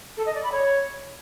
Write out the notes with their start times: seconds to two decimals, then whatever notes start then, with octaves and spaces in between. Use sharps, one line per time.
0.17 A4
0.26 D#5
0.35 D5
0.43 B5
0.52 C#5